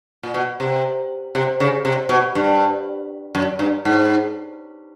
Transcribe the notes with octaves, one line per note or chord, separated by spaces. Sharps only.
A#2
B2
C3
C3
C#3
C3
B2
G2
F#2
G2
G#2